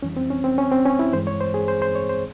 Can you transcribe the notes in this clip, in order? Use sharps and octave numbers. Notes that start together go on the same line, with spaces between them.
F2 E3 G3 C#4
C4
C#4
C4
C#4
C4
C#4
E4
G2 E3 G#3 C5
C#5
C5
G#4
C5
C5
C#5
C5